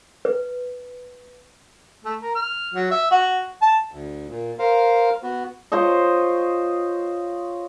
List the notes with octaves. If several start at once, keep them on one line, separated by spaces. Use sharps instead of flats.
B4
A3
A#4
F6
F#3
E5
F#4
A5
D2
A#2
A#4 C5 F5
B3 F#4
F4 C5 C#5 D#5